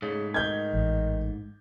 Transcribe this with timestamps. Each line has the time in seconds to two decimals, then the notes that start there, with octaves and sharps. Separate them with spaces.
0.02 G#2 C#3 A3
0.34 D#3 G6 G#6
0.73 A1